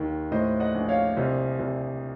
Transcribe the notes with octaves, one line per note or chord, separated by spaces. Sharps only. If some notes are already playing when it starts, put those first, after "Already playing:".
Already playing: D#2 D#3
A2 C5 D#5
D#5 F#5
A#1
C#5 F5
C2 C5 D#5
C2